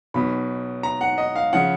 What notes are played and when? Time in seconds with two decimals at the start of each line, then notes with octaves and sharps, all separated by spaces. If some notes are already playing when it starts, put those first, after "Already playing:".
0.14 B1 B2 B5
0.83 A#5
1.01 F#5
1.18 D#5
1.36 F5
1.53 C#3 F3 F#5